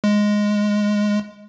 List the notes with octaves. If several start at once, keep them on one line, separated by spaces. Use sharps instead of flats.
G#3